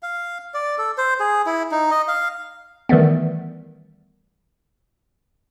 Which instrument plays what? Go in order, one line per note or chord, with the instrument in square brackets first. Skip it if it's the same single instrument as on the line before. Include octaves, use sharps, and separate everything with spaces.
[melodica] F5
D5
A4
C5
G#4
E4
D#4
D#5
F5
[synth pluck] D#3 E3 G3 A3 B3